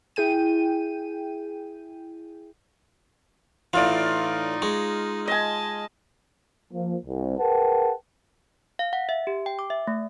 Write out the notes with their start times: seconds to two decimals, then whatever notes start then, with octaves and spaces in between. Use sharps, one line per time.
0.16 E4 G#4 G5 D#7
3.73 A2 E3 D#4 F4 D5
4.62 G#3 C#6
5.28 D#5 G#5 A5
6.74 F3 A#3
7.06 C2
7.39 G#4 A#4 B4 F#5 G5 A5
8.79 F5
8.93 F#5
9.09 E5
9.27 G4
9.46 G5
9.59 D6
9.70 E5
9.87 A3